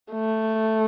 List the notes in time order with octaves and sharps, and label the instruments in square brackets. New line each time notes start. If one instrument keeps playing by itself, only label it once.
[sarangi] A3